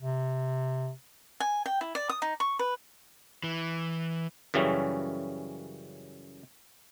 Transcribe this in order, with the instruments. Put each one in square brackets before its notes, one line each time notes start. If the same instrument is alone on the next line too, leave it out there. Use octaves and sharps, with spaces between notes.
[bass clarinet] C3
[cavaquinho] G#5
G5
E4
D5
D#6
D#4
C#6
B4
[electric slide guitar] E3
[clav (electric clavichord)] F#2 C#3 E3 G3 C#4